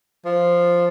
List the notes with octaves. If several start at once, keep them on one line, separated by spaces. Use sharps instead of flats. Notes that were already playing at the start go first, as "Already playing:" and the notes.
F3